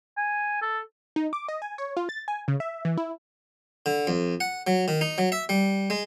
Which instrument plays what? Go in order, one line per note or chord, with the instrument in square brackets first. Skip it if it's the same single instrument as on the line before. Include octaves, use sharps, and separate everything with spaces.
[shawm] G#5
A4
[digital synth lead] D#4
D6
D#5
G#5
C#5
F4
A6
G#5
C#3
E5
E3
E4
[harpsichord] D3
F2
F#5
F#3
D#3
D#4
F#3
E5
G3
G#3